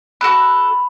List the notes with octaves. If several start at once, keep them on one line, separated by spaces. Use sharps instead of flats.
F#4 A4 B5 F#6